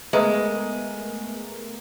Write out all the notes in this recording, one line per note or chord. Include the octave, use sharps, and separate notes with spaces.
G#3 A3 B3 A#4